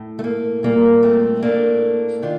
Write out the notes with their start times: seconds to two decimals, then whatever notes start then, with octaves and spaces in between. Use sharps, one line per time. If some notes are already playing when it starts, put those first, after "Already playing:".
Already playing: A2
0.19 A3
0.24 A#3
0.63 A#2 G3 A#3
1.03 A3 C4
1.42 A2 A3 A#3 D4
2.22 D#3 D4 F4